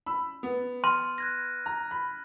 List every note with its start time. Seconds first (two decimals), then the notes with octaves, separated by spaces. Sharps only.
0.06 B5 E6
0.43 B3
0.84 B5 C6 F6 D#7
1.18 F#6 G#6 A#6
1.66 A#5
1.91 B5